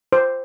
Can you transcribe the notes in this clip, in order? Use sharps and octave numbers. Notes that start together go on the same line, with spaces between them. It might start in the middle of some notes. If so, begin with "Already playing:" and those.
C5